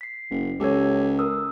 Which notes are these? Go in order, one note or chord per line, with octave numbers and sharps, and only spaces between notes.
B6 C7
F#1
C#2 G4 A4 C#5
A#4 D#6 E6